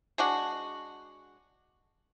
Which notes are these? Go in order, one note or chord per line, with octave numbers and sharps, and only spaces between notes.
G#3 D4 F#4